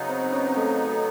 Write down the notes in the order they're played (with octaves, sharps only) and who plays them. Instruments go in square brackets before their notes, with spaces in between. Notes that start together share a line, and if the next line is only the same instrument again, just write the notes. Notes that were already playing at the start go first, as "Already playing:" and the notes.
Already playing: [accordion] C#3 F#3 B3 D#4
[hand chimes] C4 C5
C4 C5
C#4 C#5
C4 C5
A3 A4
A4